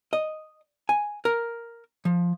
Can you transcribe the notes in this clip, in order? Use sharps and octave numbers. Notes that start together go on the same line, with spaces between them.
D#5
G#5
A#4
F3